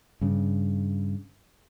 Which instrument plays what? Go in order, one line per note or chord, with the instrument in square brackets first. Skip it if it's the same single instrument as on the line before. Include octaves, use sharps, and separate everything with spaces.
[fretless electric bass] G2 C#3